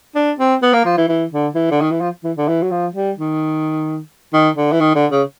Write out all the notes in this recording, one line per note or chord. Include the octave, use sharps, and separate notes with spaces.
D4
C4
B3
A#3
F3
E3
E3
D3
E3
D3
D#3
E3
F3
E3
D3
E3
F#3
F3
G3
D#3
D#3
D3
E3
D#3
D3
C#3